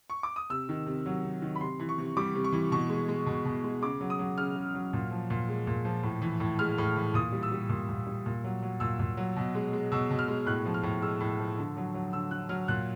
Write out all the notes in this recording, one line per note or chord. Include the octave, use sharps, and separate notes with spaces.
C#6
D6
D#6
C3 E6
D#3
C3
F#3
C3
D#3
B5
C3 C6
E3
C#6
C3
G3 D6
C3
C#6
E3
B2 C#6
G#3
G#3
B2
B2
G#3
C#3 D6
F#3
D#6
F#3
C#3 F6
C#3
F#3
A#2
F3
A#2
G#3
A#2
F3
A2
E3
A2
G#3 F6
A2
E3
A#2 D#6
G3
E6
G3
A#2
A#2
G3
A#2
F#3
F#3
A#2 E6
A#2
F#3
B2
G#3
G#3
B2 E6
B2
F6
G#3
A2 F#6
F3
F6
A2
G#3 E6
A2
F3
D3
F#3
F#3
D3 E6
D3 F#6
F#3 F6
A#2 F#6